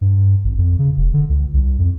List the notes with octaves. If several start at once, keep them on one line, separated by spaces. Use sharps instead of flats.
G2
G#1
F2
C#3
E1
D3
C#2
C2
F2